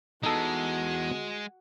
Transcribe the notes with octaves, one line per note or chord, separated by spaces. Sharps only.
E3 G#3 B3 D#4 F#4 A4